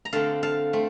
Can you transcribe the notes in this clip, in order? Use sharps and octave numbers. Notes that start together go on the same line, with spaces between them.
A#5
D3 A3 C4 F5 A5
F5 A5
A3 C4